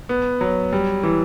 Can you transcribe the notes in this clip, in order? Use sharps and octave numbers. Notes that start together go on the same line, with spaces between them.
B3
F#3
G3
E3